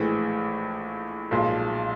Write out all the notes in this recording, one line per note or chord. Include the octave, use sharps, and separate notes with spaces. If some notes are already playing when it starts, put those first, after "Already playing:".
Already playing: A#1 A2 E3 G#3
B1 A#2 F3 G#3